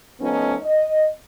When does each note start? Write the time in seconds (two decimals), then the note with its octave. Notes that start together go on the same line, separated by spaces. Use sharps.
0.20 F3 A3 B3 C#4 D#4
0.62 D#5